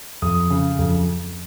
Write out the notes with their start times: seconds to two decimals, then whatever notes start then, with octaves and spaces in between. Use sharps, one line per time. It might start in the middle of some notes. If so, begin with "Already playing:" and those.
0.22 F2 D#6
0.50 C#3
0.79 F2